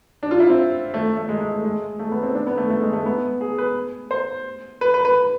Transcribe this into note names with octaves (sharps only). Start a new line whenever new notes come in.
D4
F4
E4
C4
A3
A3
G#3
G#3
A3
G#3
A3
B3
C4
D4
B3
A3
A3
G#3
A3
B3
G#4
B4
C5
B4
B4
B4